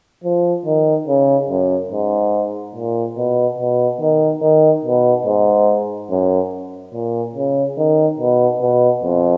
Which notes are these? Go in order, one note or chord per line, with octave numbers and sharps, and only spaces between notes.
F3
D#3
C#3
F#2
G#2
A#2
B2
B2
D#3
D#3
B2
G#2
F#2
A#2
C#3
D#3
B2
B2
F2